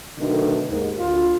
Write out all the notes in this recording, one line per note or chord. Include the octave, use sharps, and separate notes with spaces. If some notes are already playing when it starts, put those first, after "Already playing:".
B2 D3 D#3 F#3 A3 B3
D#2 G#2
D2 F4